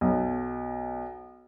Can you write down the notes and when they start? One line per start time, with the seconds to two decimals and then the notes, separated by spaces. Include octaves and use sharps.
0.01 B1